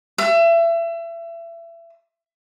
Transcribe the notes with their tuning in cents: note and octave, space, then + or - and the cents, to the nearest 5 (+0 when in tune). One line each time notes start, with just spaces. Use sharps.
E5 +30